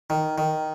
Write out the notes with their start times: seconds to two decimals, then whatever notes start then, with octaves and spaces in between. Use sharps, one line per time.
0.10 D#3
0.38 D#3